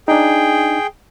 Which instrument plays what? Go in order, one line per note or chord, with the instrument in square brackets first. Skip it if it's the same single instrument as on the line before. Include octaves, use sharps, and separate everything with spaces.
[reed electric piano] D4 D#4 [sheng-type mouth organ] G#4 G5